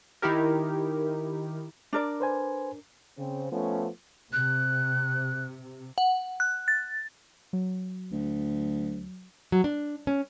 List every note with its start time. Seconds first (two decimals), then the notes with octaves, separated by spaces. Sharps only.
0.22 D#3 D#4 E4 G4 A#4
1.93 D4 A#4 D5
2.20 B4 C5 G#5
3.18 C#3 C4
3.52 F3 A3 B3 C#4
4.33 C3 F#6
5.98 F#5
6.40 F#6
6.68 A6
7.53 F#3
8.12 D2
9.52 F#3
9.64 D4
10.07 C#4